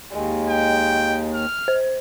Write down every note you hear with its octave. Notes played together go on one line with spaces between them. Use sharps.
D#2 G#3
G5
F6
C5